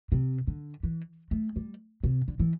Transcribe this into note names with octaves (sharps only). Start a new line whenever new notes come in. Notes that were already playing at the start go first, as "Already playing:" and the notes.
C3
D3
E3
A3
G3
C3
D3
E3